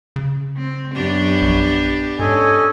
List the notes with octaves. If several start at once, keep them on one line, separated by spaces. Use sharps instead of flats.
C#3
C4
F#2 B3 D4 G4
A#1
G#2 C#4 A4 D#5 G#5